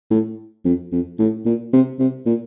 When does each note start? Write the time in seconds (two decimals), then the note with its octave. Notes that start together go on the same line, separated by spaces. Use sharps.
0.11 A2
0.65 F2
0.92 F2
1.19 A2
1.46 A#2
1.73 C3
1.99 C3
2.26 A#2